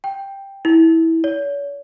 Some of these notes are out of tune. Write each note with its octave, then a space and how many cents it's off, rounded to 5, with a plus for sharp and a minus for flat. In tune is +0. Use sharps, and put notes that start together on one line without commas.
G5 +5
E4 -15
C#5 +45